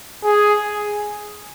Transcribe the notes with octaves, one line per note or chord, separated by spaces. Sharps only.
G#4